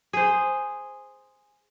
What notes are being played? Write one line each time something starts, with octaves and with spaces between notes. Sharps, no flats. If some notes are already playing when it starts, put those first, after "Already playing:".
G#4 C5